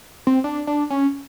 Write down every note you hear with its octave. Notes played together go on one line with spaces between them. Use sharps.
C4
D4
D4
C#4